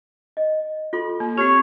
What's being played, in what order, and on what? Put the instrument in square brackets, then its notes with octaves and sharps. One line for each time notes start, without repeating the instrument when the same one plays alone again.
[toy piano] D#5
F4 A4 C6
[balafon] A#3
[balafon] C4 G4 [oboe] C#5